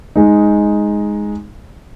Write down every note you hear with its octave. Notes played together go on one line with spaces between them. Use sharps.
G#3 D#4